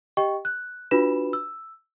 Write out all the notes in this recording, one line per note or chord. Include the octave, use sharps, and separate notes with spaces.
G4 D#5 G5 C#6
F#6
D4 F4 F#4 B4 B5 E7
E6